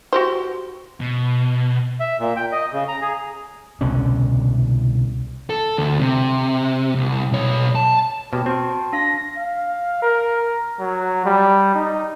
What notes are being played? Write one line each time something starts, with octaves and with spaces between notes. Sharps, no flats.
F#4 G4 C5
B2
E5
A#2
G5
D#5
C#3
A#5
G#4
C2 B2 D3 C#4
A4
D2
C3
C2
B1 C#5
A5
B2 G4 C#5 A5 F6
C4 F#4 G5 A5 C6
D4 F5 A#6 B6
F5
A#4
F#3
G3
D#4